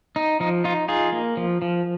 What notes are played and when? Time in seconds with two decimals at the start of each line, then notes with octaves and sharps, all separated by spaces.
0.16 D#4
0.40 F3 D#4
0.64 D#4 F4
0.88 D#4 F4 G#4
1.12 A#3
1.37 F3
1.62 F3